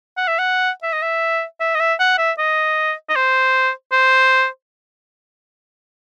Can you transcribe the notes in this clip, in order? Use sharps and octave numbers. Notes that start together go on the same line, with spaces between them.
F#5
E5
F#5
E5
D#5
E5
E5
D#5
E5
F#5
E5
D#5
D#5
C5
C5